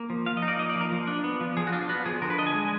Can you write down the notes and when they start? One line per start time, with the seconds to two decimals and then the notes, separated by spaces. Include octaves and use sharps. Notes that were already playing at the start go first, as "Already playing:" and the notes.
Already playing: A#3
0.10 F3
0.26 F3 F5
0.37 D#5
0.42 D#4
0.48 D5
0.59 A#3 D#5
0.70 D5
0.75 F3
0.81 A#4
0.92 F3
1.07 D4
1.24 B3
1.41 F3
1.57 F3 G#4
1.67 F#4
1.73 D4 F4
1.89 B3 F#4
2.06 F3 G#4
2.22 D3 A#4
2.30 B4
2.38 D4 D#5
2.47 G#5
2.54 G#3